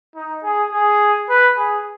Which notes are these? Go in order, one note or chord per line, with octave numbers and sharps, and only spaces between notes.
D#4
G#4
G#4
B4
G#4